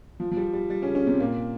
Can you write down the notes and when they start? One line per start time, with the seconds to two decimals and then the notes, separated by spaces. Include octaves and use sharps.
0.20 F3
0.31 F3
0.37 G3
0.53 G3
0.70 G3
0.82 C#3 C#4
0.95 C#3 C#4
1.07 C3 C4
1.20 A#2 A#3